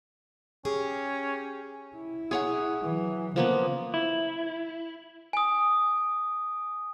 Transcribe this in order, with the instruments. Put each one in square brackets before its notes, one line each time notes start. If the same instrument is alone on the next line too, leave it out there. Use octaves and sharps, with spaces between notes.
[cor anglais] C#4 [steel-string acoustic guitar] G4 G#4
[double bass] E4
[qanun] G#4 C#5 F#5
[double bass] E3 F#3
[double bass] C#3 [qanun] F3 A#3 B3
[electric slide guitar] E4
[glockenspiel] G#5 D#6